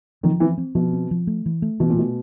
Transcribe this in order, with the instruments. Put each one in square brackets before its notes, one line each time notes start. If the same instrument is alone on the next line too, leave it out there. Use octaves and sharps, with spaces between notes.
[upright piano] D#3 [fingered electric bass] F3
[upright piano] E3 [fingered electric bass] C4
[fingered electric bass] C4
[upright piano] B2 [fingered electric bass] F3
[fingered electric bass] C4
F3
A3
E3
A3
[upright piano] B2 [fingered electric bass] E3
[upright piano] A#2
[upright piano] B2 [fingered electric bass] A3